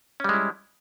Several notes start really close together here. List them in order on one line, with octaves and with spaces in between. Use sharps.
C#4 G3 G#3 E4